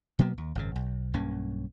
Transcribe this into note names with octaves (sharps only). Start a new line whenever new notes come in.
B2 F#3 A#3 B3
D#2
G#1 F#2 C#3
B1
B1 G2 A#3 C#4